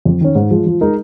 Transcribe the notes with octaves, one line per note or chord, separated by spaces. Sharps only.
F2
D#3 C#4
G#2
F3 G#3
F3
G#3 D#4 A#4